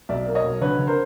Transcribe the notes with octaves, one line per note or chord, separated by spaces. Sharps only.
B1 D5 E5
A#3
C#5 D#5
B1
D3 B4 C#5
D3
A#4 C5